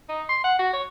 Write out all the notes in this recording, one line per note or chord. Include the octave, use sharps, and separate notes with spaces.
D#4
C6
F#5
F#4
C#5